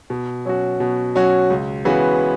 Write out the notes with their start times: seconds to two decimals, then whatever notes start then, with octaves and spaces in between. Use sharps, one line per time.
0.10 B2
0.45 F#3 C#4 F#4
0.80 B2
1.15 F#3 C#4 F#4
1.50 C#2
1.85 C#3 E3 B3 F#4